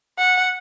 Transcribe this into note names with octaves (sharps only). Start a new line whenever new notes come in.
F#5